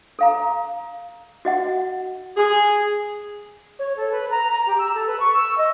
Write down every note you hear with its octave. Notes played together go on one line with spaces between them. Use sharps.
A4 F5 A#5
F#4 D#5 F#5
G#4
C#5
A4
B4
A#5
A#5
G4
E6
A4
B4
C#6
E6
D#5